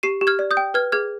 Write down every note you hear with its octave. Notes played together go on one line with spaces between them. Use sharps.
G4 C7 D#7
G4
F6 G#6
D5
D#6 G6
G5
B4 F6 G#6
G#4 F6 G#6